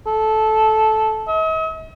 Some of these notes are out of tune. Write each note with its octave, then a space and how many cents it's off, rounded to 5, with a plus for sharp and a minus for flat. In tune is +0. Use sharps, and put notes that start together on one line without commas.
A4 -15
D#5 +45